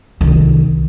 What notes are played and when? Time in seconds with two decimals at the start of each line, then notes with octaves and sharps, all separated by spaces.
0.21 C2 D#3